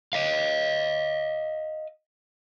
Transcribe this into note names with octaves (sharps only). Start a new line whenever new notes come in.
D#5 F5